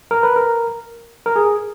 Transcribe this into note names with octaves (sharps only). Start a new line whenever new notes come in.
A#4
B4
A#4
A#4
G#4